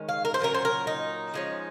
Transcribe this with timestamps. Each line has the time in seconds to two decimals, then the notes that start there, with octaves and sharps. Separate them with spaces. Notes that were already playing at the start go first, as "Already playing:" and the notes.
Already playing: D#3 G#3 C#4
0.09 F5
0.25 A#4
0.34 C5
0.40 A#2 F#3 C#4 A#4
0.54 C5
0.65 A#4
0.87 D#4
1.34 F3 G#3 C#4